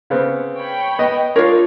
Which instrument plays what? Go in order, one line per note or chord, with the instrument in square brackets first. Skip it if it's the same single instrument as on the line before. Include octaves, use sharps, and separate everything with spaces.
[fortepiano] C#3 B3 C4
[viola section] C#5 G5 B5
[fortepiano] B3 D#5
[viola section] G#3 D#4 F4 [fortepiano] D4 C#5 [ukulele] A#4 F5